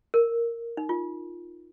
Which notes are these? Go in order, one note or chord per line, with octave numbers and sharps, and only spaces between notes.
A#4
D#4
F4